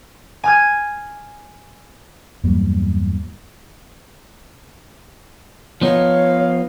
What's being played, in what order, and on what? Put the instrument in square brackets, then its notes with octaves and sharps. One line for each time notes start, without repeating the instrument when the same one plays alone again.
[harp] G#5 F6 G#6
[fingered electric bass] E2 G2 F#3 A#3
[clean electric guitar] F3 B3 D#4 [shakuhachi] C#5 [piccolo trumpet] F5